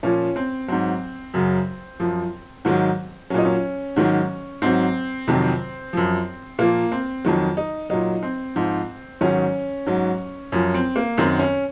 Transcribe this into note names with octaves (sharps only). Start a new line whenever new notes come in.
A#2 F3 C#4
C4
G#2 F#3 C4
F#2 C#3 F#3
F#2 F3
G#2 D#3 F#3
A#2 F#3 C#4 D#4
C#4
G#2 D#3 F#3
G#2 F#3 C4
F2 C3 D#3 F#3
F#2 F3
A#2 F3 A#3
C4
F2 D#3 F#3
D#4
A#2 F#3 D#4
C4
G#2 F3
G#2 D#3 F#3 C#4
G#2 F#3
F#2 F3 C#4
C4
A#3
F#2 D#3 F#3 C4
C#4